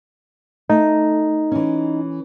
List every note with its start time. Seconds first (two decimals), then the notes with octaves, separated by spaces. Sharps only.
0.70 A3 D#4
1.52 E3 C#4